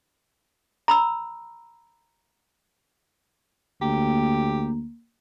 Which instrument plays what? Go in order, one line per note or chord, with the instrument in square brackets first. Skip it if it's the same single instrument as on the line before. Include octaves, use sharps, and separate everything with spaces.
[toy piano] A#5 B5 E6
[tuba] D2 [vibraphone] A#3 [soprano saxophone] G4